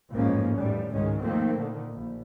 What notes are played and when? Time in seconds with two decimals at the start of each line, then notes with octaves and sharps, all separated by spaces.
0.12 A1 F2 G#2 F3 A#3 C#4
0.57 A1 F2 A2 D#3 G3
0.92 G#1 C#2 D#3 G#3 C#4
1.22 D#2 D#3 F3 A3 A#3 C4
1.56 A#2 D3 D#3
1.92 A#1